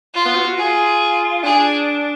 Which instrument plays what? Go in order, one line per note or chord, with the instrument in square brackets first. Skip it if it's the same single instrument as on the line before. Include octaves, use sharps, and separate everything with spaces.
[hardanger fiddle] F4
[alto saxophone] B3
F#4
F#4
[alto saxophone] F4 [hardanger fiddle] G#4
[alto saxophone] D4 [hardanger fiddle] G#4